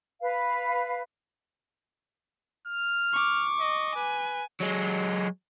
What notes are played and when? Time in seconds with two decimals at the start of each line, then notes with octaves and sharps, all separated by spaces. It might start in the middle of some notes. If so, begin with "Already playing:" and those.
0.21 B4 F5
2.67 F6
3.13 C#6 D6
3.60 D#5
3.96 B4 G#5
4.61 F#3 G#3